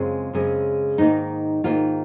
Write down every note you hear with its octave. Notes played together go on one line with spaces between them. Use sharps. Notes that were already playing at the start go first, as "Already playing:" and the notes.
Already playing: F#2 C#3 G#3 C4 F4
F#2 C#3 G#3 C4
G#2 D#3 A#3 D#4
G#2 D#3 A#3 F4